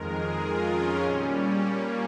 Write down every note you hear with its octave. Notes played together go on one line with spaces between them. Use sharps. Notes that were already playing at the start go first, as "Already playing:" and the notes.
Already playing: F2 D#3 G#3 A#4
G#4
F4
C#4
A#2 G3
A#3